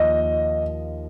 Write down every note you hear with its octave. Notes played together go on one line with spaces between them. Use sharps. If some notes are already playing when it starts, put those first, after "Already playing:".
Already playing: D#2 F3 D#5